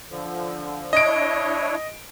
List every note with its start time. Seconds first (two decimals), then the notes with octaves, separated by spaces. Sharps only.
0.10 D3 F3
0.93 D4 E4 C#5 D#5 D7